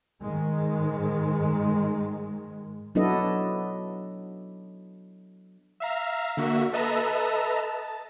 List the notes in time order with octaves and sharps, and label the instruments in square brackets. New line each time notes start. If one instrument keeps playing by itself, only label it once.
[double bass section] G#2 D#3 G#3
[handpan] F#3 B3 D4 E4 A4 D#5
[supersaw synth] E5 F5 A#5
D3 A#3 F#4 E5
A4 B4 D#5 E5 A5 A#5
A5